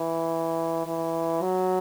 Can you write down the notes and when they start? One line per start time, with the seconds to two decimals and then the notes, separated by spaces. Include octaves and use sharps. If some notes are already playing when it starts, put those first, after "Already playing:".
Already playing: E3
0.87 E3
1.42 F#3